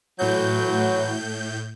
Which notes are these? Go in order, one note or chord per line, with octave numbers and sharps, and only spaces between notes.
A2 E3 F#3 G6